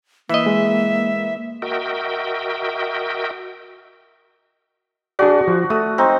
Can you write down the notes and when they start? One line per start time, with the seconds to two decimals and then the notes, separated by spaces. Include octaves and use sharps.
0.29 E3 A#3 D#5 E5
0.46 G#3
1.62 F#4 A#4 D#5 E5 G5
5.19 D4 F#4 G#4 D5
5.48 F3
5.70 A3 D#6
5.98 C4 D#4